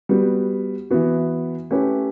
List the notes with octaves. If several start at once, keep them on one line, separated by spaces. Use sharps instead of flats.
G3 B3 F#4
E3 B3 F#4
A3 C#4 E4 G4 B4